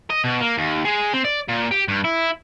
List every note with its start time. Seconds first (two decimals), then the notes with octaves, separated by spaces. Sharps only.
0.10 D#5
0.24 B2
0.41 A#3
0.58 D#2
0.85 G#3
1.13 C4
1.25 D5
1.49 A#2
1.71 G4
1.88 G2
2.04 E4